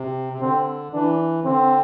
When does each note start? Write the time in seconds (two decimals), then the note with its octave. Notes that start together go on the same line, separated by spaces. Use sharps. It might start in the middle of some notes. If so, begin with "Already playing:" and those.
Already playing: C3
0.33 C3
0.41 D3 C4
0.93 E3 D4
1.45 D3 C4